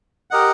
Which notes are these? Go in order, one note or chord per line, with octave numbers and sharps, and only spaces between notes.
G4 A#4 D#5 F#5